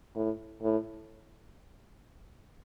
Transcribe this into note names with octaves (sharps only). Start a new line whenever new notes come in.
A2
A2